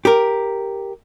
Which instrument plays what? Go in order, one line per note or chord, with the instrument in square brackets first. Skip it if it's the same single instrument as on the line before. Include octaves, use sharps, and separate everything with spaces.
[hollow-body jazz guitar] G4 A#4